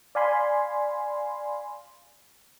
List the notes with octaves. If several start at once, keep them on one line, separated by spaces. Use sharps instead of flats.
D5 F5 G#5 B5 C6